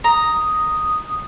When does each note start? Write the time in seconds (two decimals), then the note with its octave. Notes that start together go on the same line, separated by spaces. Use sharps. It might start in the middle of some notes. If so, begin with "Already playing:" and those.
0.04 A#5 D#6